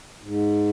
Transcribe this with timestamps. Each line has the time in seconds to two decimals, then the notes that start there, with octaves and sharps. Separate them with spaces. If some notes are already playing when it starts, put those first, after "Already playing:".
0.23 G#2